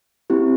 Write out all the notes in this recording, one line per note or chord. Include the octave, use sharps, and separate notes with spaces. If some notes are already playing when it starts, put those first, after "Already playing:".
C4 E4 G4